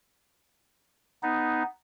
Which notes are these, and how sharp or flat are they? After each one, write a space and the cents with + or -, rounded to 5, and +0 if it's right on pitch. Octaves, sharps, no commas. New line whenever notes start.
B3 +5 D#4 +0